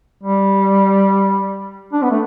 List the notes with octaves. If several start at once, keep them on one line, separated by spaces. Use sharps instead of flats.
G3
D4
B3
A3